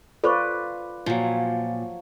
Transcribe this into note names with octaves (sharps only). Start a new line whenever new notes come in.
F4 A4 B4 C5 D5 C#6
A#2 F3 F#3